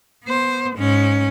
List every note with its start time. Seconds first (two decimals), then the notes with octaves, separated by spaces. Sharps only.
0.24 B3 C5
0.76 G#2 C#4